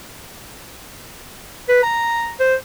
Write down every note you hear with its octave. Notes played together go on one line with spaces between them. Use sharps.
B4
A#5
C5